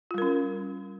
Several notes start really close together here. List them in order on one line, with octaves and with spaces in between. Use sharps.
F4 G3 A#4 C#4